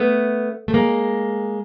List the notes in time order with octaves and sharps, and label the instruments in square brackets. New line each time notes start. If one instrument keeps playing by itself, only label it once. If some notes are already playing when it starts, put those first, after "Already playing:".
Already playing: [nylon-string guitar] A3 B3
A3
G#3 A#3